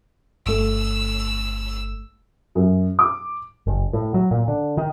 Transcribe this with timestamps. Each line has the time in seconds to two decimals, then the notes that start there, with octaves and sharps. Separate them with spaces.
0.46 G1 A3 E6
2.55 F#2
2.99 D6
3.67 F#1
3.93 A2
4.14 F#3
4.31 A#2
4.48 D3
4.77 D#3